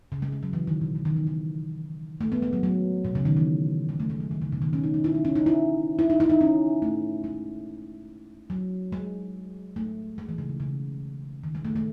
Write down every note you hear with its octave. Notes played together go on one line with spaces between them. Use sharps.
C#3
G#3
G#3
F#3
E3
D#3
B2
C#3
D#3
E3
D#3
A3
B3
G#3
F#3
F#3
B2
C#3
D#3
E3
G#3
A3
G#3
F#3
D#3
C#3
B2
D#3
C#4
D#4
D#4
E4
D#4
C#4
D#4
E4
E4
D#4
E4
D#4
C#4
A3
G#3
F#3
G#3
A3
G#3
E3
C#3
B2
C#3
D#3
G#3
A3
A3